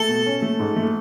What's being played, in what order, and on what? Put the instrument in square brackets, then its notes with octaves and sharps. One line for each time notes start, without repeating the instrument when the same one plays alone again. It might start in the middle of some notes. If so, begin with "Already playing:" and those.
Already playing: [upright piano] A3 [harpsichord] A4
[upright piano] B2
C#4
A3
G#2
A3